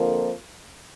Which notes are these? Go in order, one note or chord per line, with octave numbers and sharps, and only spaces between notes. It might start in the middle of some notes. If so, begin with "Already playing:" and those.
Already playing: F2 D3 F3 A#3